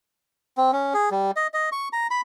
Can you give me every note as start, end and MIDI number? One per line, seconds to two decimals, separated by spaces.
0.57 0.71 60
0.72 0.94 61
0.94 1.09 68
1.11 1.31 55
1.36 1.47 75
1.54 1.69 75
1.72 1.88 85
1.93 2.07 82
2.11 2.21 83